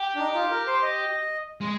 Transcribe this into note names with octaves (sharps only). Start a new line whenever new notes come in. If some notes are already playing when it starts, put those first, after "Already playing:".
Already playing: G4
D4
D#4
D#4
F4
A#4
C5
D#5
G#3